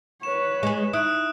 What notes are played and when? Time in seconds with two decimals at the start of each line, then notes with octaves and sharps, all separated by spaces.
0.23 B4 C#5 E7
0.63 G#3 G#4
0.93 D#4 E4 D#6 F#6 D7